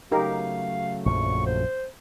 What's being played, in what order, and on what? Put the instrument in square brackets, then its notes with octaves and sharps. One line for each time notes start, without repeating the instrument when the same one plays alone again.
[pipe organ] C#3 F#3 A3 [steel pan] D#4 G4 A#4 [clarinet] F5
[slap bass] A#1 F#2 F3 [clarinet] C#6
[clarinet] C5